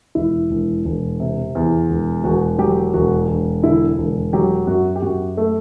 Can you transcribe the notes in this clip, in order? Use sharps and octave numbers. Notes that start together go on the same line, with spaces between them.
E1 E4
E1
E1
C3
E2
E1
E1 F#4
F#3 G4
E1 F#4
E1
D3 E4
E1
F#3 G4
F#2 F#4
G4
F#2 F#4
A3